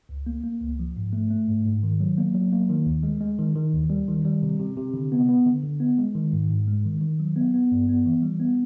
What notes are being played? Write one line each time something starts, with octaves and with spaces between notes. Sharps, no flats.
C#2
A#3
A#3
C#2
F3
G#2
A3
A3
G#2
G#2
D#3
F#3
A#3
F#3
A#3
D#3
D#2
G#3
G#3
D#3
D#3
D#2
G3
D#3
G3
C3
C3
C3
D3
B3
B3
D3
D3
B3
G#3
D#3
G#2
G#2
G#3
D#3
D#3
F#3
B3
B3
G2
B3
E3
G3
B3